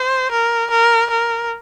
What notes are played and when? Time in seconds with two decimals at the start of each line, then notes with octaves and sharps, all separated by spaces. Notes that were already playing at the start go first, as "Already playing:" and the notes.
Already playing: C5
0.32 A#4
0.71 A#4
1.10 A#4